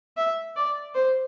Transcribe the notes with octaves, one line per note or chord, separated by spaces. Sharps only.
E5
D5
C5